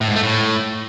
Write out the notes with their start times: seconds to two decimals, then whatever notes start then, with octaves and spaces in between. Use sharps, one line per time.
0.01 A2
0.08 G#2
0.16 A3
0.23 A2